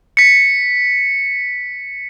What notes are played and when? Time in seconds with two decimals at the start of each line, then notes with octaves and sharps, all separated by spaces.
0.17 B6 C#7